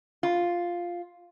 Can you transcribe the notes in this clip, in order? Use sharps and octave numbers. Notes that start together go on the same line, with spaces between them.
F4